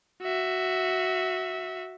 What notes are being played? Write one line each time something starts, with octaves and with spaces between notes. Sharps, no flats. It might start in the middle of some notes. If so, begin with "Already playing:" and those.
F#4 E5